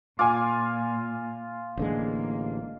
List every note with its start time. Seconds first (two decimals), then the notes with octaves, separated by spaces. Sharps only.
0.19 A#2 F4 G#5 D6
1.77 A1 D3 G#3 A#3